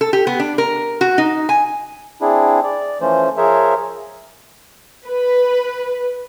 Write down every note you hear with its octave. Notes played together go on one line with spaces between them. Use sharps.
A4
G4
B3
D4
A#4
F#4
D#4
G#5
C4 D4 E4 G#4
D5
E3 F3 A3 C#4 C5
F3 G#4 A#4 C5 C#5 E5
B4